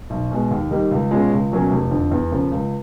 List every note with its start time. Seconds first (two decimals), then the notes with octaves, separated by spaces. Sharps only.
0.10 B1
0.31 B2 G#3
0.51 D#2
0.71 D#3 G3 A#3 D#4
0.91 C#2
1.11 B2 G#3 C#4 F4
1.32 C#2
1.52 B2 F#3 A#3 C#4
1.71 F1
1.91 F2 D3
2.11 E2
2.32 C#3 F3 A#3
2.51 C#2